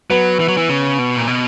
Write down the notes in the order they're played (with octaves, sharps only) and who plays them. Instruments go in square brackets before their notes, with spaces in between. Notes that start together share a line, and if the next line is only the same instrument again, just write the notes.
[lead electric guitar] F#3 [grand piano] B3 B4
[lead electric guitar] E3
F#3
E3
C#3
B2
A#2
B2